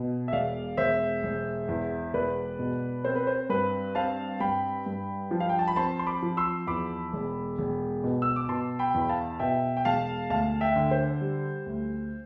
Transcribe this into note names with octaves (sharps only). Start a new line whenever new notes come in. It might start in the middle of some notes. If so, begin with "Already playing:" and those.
Already playing: B2
E5
E1 D5 F5
E1 C5 E5
E1
E2
E1 B4 D5
B2
C4 C5
B4
C5
G2 B4
C4 F5 A5
G2 G5 B5
G2
F3
F5
G5
A5
B5
C4 A5 C6
C6
B5 D6
F3
C6 E6
E2 B5 D6
E1
E1
B2
E6
D6
B2 A5 C6
G5 B5
E2
B5
F5 A5
B2 E5 G5
G5
E1 F5 A5
D2 F5 A5
E5 G5
D3
C5
G3
D2